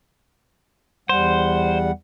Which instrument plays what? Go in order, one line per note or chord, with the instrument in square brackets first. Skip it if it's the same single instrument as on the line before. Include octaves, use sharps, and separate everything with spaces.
[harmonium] E2 G3 F#5 [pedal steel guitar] C5